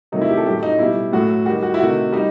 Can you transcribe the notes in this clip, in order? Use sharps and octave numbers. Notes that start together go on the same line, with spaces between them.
C3 D#3 F#3 A3 D#4
E4
G4
A4
A2 F#3 A3 G4
D#4
B2 G3 E4
A2 F#3 A3 F#4
D#3 G3 F#4
F#4
E4
C3 D#3 A3 F#4
G3 D#4